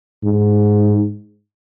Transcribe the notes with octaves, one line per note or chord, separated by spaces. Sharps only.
G#2